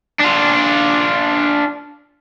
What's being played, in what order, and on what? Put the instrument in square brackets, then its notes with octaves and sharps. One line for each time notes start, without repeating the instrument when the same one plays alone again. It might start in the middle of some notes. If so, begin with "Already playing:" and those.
[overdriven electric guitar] D4 F4